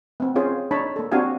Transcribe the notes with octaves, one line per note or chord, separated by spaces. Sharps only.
B3 C4
C#4 F4 G#4 C5
D4 D#4 C#5 A5 B5
A#3 A4
C4 D4 F#4 G4 F5 G#5